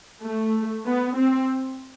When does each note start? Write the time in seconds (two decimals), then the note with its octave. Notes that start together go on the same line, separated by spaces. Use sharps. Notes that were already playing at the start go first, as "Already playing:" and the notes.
0.22 A3
0.86 B3
1.17 C4